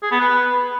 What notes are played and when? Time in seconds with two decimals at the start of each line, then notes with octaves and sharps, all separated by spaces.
0.03 G#4
0.11 B3
0.20 B4